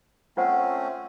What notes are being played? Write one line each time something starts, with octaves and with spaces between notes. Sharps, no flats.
A3 C4 C#4 F4 C5 F#5